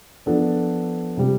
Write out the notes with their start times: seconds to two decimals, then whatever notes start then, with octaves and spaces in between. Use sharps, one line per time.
0.26 F3 B3 D4 A4 D5
1.17 C3 G3